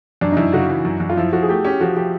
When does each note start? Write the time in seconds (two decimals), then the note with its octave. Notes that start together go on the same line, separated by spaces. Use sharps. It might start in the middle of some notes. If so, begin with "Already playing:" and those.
0.21 F#2 D4
0.32 D#4
0.37 F#2 E4
0.53 C#3 F#4
0.70 E3
0.85 F#2
1.00 F#2
1.10 F4
1.17 F3 E4
1.33 F3 F#4
1.42 G#4
1.49 A3 G4
1.65 C#4 G4
1.80 F3 F#4
1.96 F3 G4